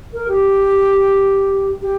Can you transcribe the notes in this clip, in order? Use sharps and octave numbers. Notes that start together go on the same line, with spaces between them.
A#4
G4
G4